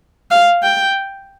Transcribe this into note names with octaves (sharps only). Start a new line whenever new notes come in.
F5
G5